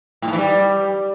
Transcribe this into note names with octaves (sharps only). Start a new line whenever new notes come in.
A2
G#2
E3
G3